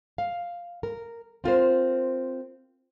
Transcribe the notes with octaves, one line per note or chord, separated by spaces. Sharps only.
F5
A#4
C4 F4 A#4 C5